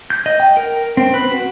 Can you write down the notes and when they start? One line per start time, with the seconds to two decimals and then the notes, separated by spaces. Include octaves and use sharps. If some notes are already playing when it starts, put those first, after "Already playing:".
0.10 G6
0.26 D#5
0.40 G5
0.57 A#4
0.97 C4
1.14 B4
1.32 F#4